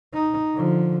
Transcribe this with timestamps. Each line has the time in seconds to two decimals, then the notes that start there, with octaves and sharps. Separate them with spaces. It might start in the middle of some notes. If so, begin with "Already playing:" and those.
0.13 D#4
0.55 D3 F3